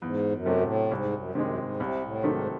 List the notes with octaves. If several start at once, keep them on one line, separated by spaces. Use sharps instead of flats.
E2 G#2
F#2
C3 F#3 A3
A2
C2 G#2
F#2
F#2 C3 D#3 G#3
G#2
C2 C3
A2
G#2 C3 D#3 F#3 A3